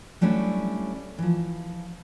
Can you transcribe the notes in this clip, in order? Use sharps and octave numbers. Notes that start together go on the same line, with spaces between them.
F#3 G3 A3 C#4 D4 E4
E3 F3